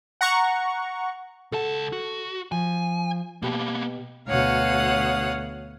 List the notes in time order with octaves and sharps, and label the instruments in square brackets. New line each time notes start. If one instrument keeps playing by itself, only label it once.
[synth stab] F#5 A#5 C#6
[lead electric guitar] C#2 A5 [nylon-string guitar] A4 F#5
[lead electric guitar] F#4
[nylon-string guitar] F3 [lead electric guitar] G#5
[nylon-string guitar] B2 G4 [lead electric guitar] A#3 B3
[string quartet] D2 B2 C#5 F5 F#5 D#6